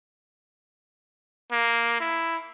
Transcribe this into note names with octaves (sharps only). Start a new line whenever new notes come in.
A#3
E4